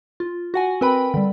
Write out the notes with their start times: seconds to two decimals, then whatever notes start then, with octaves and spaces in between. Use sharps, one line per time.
0.20 F4
0.54 F#4 F#5 G#5
0.81 C4 A#4 B4 G5 B5
1.14 D3 G3